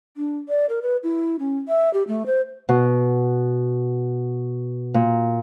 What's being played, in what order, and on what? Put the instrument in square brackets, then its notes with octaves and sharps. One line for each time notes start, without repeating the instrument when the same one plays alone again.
[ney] D4
D5
A#4
B4
E4
C#4
E5
G4
A3
C5
[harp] B2
A#2